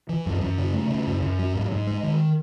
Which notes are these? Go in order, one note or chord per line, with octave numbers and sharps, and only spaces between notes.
E3
F#2
F#2
C#3
A3
C#3
F#2
F#2
F#3
G#2
G#2
G#3
D#3